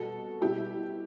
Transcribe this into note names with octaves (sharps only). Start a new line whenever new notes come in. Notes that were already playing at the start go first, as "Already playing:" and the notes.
Already playing: B2 G3 F#4 A4
B2 G3 E4 G4